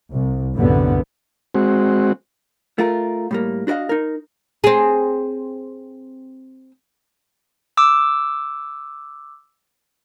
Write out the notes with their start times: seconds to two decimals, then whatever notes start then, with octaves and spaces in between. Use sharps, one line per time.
0.11 C2
0.54 C2 F#2 A2 D3 G3 B3
1.55 G#3 C4 F#4
2.78 A3 F4 A#4
3.31 A2 G3 A#3
3.67 D4 F#4 A#4 D#5 F5
3.89 D#4 A#4
4.64 C4 G#4
7.77 D6 E6